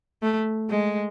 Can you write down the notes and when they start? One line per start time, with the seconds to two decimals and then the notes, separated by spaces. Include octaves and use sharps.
0.22 A3
0.70 G#3